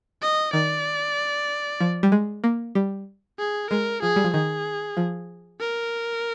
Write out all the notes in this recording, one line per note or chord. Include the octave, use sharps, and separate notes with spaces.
D#5
D#3 D5
F3
G3
G#3
A#3
G3
G#4
G#3 A#4
F3 G#4
G3
F3
D#3 G#4
F3
A#4